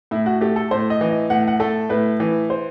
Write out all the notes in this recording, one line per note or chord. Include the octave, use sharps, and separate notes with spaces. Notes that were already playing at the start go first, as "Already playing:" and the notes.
A2 E4
F#4
A3 G4
A4
A2 C5
D#5
E3
D#5
A2 F#5
F#5
A3 A4
A2 B4
E3
C5